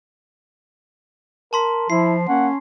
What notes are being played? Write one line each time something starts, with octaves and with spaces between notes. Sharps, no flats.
A#4 A5 C6 B6
F3 E4 C7
A#3 C#4 F#5